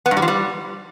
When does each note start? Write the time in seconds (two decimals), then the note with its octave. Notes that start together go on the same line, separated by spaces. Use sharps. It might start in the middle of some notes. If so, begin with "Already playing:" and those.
0.06 B3
0.11 G2
0.17 G3
0.22 F3
0.28 G3